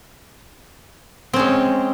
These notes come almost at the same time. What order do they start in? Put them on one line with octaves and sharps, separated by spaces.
C4 C#4 G#3